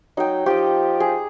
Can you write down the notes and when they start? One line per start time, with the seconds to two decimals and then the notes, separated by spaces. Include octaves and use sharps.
0.17 F#3 D#4 G5
0.46 F3 G4 D#5
1.00 G#4